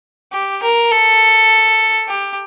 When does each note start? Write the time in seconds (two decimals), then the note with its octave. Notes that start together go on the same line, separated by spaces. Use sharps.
0.32 G4
0.63 A#4
0.92 A4
2.08 G4